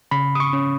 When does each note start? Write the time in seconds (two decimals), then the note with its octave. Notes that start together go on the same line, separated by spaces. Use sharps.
0.11 C#3 B5
0.35 D#6
0.40 C#6
0.53 C#4